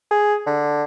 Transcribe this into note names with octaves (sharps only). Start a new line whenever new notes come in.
G#4
D3